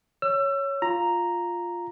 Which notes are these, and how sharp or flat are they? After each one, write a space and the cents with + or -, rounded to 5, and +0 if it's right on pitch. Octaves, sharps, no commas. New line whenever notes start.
C#5 +0 E6 +30
F4 +0 A#5 +0